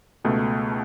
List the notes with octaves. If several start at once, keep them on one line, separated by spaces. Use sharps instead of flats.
C#2 B2 A3